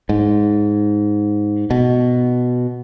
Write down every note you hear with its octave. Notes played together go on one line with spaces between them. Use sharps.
G#2
B2